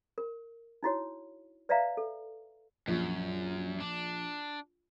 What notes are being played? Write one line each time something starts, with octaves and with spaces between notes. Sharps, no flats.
A#4
D#4 E4 F#4 C#5
B4 D5 E5 F5 A#5
A4
A#1 F#2
D4